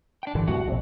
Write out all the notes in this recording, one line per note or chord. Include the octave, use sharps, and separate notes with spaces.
D4 G5
G2 D3 E3
C2 A2 F#4
A#1 C3